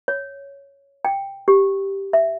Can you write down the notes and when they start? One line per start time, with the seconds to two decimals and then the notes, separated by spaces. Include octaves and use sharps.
0.08 C#5
1.05 G5
1.48 G4
2.13 E5